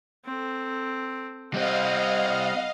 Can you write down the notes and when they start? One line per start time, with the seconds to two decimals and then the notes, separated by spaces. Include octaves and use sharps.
0.25 C4 A4
1.54 G3 C4 D#5 F5 F#5